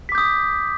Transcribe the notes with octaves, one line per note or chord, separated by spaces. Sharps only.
D6 D#6 G6 B6